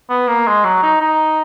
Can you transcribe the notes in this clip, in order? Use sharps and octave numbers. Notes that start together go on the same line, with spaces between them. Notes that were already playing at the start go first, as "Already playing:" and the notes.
B3
A#3
G#3
F#3
D#4
D#4